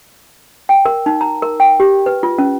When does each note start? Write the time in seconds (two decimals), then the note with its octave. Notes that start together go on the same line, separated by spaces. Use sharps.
0.69 G5
0.85 A#4
1.06 D#4
1.21 A#5
1.42 A#4
1.60 G5
1.80 G4
2.06 B4
2.23 F4
2.38 C#4